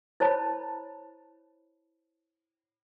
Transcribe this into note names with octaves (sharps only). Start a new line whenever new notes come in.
E4 C5 C#5 A5 B5